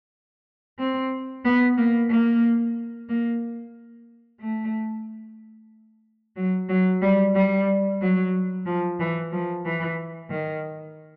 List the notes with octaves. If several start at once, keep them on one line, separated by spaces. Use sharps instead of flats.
C4
B3
A#3
A#3
A#3
A3
F#3
F#3
G3
G3
F#3
F3
E3
F3
E3
D#3